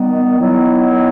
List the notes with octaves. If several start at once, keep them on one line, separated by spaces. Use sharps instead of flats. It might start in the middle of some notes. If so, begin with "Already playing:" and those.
Already playing: D#3 G3 B3
D#3 F#3 B3 E4